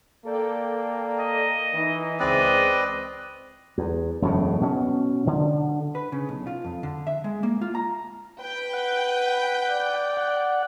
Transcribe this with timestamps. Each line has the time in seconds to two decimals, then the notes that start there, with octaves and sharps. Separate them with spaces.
0.25 A#3 A4 D5 G5
1.19 D#5
1.74 E3 D#4
2.20 C#2 G#3 C4 B4 D5 D#5
3.78 E2
4.22 E1 F#2 A2 C#3
4.61 B2 C#4
5.27 D3
5.95 B4
6.12 C#3
6.29 B1
6.47 F4
6.64 F2
6.83 D3
7.07 E5
7.24 G#3
7.43 A#3
7.61 F4
7.75 A#5
8.40 B4 G5
8.73 F#5
9.69 D5
10.17 F#5